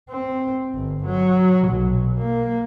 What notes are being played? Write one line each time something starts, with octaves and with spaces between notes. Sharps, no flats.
C4
G1
F#3
B1
A#3